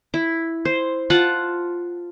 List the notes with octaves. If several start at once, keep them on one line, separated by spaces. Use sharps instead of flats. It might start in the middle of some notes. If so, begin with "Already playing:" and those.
E4
C5
F4 F#5 A5